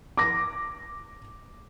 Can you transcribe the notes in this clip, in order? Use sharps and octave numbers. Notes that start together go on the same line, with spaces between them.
D6 A#6